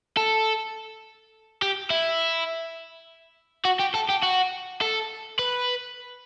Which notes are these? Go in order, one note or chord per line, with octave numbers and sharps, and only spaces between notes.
A4
G4
E4
F#4
G4
A4
G4
F#4
A4
B4